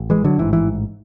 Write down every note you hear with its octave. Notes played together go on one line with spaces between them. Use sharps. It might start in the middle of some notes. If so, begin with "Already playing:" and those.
Already playing: A1
E3 G#3
D3 F#3
A1 G#2 E3
E3